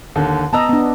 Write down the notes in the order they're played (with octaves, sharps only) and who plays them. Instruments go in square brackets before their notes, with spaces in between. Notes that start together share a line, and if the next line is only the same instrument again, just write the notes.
[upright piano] D#2 D3
[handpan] B3 D#5 [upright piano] A5 A#5 E6
[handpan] B3 D4